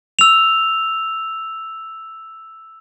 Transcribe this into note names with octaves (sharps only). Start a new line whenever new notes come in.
E6 F7